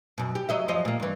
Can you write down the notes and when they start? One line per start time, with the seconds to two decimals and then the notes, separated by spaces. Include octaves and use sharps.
0.18 F#2 B2
0.35 G4
0.49 F#3 D#5 E5
0.68 F#2 F3 D#5
0.85 A#2 A#3
1.00 G2 E3